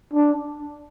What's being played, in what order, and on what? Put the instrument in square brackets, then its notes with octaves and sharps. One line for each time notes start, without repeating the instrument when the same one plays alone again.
[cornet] D4